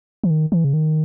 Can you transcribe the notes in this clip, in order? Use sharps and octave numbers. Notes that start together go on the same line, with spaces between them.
E3
D#3
E3
C#3
D#3